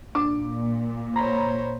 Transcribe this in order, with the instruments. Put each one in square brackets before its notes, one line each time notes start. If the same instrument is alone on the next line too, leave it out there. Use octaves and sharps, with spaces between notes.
[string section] A#2 [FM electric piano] D4 [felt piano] D6
[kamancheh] C5 C#5 [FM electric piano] A#5 B5